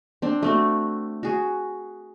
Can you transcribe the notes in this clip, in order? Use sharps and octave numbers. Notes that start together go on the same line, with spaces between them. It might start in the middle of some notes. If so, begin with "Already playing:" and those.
C4 D4
A3 C4 F#4
F#4 G#4